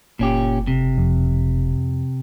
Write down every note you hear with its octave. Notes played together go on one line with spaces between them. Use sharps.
F#1 A#2 C#4 G4
C3
F2